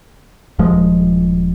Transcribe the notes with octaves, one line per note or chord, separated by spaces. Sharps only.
D#1 D#2 F3 G#3